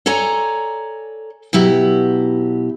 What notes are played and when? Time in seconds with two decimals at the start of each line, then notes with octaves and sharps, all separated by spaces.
0.06 A4 C#5 D5 G#5 A#5
1.53 B2 F#3 E4 G4